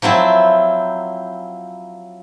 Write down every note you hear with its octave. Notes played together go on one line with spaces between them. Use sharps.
F3 F#3 C4 E4